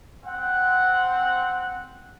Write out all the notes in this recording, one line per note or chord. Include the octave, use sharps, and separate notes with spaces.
C4 F#5